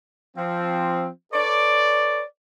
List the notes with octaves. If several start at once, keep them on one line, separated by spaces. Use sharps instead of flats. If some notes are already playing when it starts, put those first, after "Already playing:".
F3 C4
A4 B4 C#5 D5